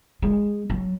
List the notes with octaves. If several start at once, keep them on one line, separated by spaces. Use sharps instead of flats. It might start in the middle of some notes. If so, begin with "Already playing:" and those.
G#3
F#3